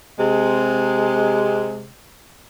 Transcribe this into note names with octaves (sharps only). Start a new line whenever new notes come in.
C3 G#3